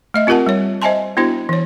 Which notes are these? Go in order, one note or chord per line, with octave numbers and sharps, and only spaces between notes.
A3 D#5 E5
C4 F4 G4 A#4 F#5 A5
G3 C#5
C5 D#5 E5 G#5 A5 C6
B3 D4 E4 F#4 C5
E3 C#5